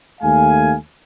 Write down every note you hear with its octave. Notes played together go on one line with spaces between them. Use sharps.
D#2 A3 F5 G#5